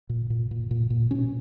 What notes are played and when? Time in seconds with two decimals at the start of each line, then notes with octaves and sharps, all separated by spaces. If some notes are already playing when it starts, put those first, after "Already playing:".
0.09 A#2
0.30 A#2
0.51 A#2
0.71 A#2
0.90 A#2
1.11 B2 C#4